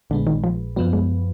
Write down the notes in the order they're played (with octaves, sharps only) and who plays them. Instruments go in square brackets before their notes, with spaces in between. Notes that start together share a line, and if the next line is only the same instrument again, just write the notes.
[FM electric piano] A#1 A#2 G#3 B3 [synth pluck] D3
[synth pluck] D#3
F3
[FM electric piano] F#2 F3 B3 [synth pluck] F#3
[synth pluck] G#3